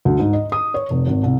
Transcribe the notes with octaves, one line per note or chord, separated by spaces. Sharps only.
D2
G#2
D#5
D#6
C#5
F1
G#1
C2